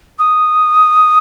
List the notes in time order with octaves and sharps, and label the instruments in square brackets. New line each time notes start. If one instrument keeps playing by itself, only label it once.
[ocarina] D#6